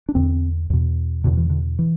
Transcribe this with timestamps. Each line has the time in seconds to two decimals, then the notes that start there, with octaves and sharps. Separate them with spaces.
0.09 D4
0.15 E2 D3 C4
0.70 E2 B2
1.24 E2 B2 D3
1.37 E3
1.50 D3
1.79 E3